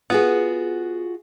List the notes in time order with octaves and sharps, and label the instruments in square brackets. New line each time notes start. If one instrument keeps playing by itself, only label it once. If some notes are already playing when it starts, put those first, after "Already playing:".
[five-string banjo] B3 [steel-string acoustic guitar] F4 F#4 G#4